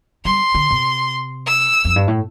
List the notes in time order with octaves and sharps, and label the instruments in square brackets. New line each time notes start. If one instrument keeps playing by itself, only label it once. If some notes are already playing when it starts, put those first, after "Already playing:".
[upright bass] G3 [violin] C6
[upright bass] D3
C3
[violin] E6
[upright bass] F2
G2
A2